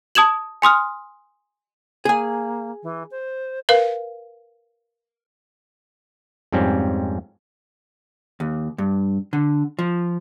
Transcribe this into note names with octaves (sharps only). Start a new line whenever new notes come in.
A5 D#6 G#6 E7 F#7
G#5 C6 D#6 F6
A#3 G#4 G#5
E3
C5
A#4 B4 F5
F2 G#2 G3 C4 C#4
D#2
G2
D3
F3